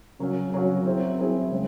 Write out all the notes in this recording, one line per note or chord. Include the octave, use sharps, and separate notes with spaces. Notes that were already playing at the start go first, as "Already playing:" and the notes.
C#3 F#3 C#4 F#4
C#3 F#3 C#4 F#4
F#3 C4 E4 G#4
F#3 C4 E4 G#4
C#3 G#3 C4